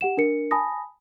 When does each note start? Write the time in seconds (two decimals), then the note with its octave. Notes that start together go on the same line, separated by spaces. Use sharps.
0.01 G4 F#5 E7
0.17 D4 A#4 C#7
0.51 G#5 A5 B5 D#6 A#6